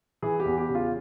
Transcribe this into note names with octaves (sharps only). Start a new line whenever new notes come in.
E3 G#4
G4
E2
G4
C#3
F4